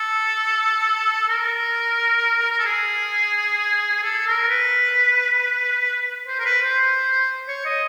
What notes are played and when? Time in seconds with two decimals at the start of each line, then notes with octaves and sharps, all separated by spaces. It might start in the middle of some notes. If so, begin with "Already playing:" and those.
Already playing: A4
1.28 A#4
2.51 A#4
2.58 A4
2.65 G#4
4.03 A4
4.26 A#4
4.49 B4
6.27 C5
6.39 A#4
6.45 B4
6.62 C5
7.48 C#5
7.65 D#5